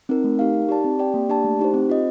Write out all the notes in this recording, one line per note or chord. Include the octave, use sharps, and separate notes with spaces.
C4 D#4 A#4
A3
D#4 G4 A#4 F5
D#4
G4 D5 A5
C4
G4 D5 G5
A#3
D4 G4 D5 A5
A3
D#4 G4 C5
C4
F4 C5 D#5